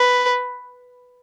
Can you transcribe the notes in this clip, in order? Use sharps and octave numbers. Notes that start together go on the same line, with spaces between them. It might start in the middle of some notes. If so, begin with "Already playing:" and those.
Already playing: B4